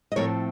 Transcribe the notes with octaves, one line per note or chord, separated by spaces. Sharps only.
D#5
A2 F3 A3 C4 A#4 C#5